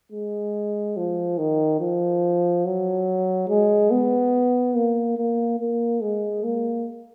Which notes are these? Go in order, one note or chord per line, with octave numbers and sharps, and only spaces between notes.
G#3
F3
D#3
F3
F#3
G#3
B3
A#3
A#3
A#3
G#3
A#3